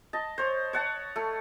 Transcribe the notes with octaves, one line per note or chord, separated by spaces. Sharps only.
D#5 A5
C5 C#5
C#5 F#5 A5
A3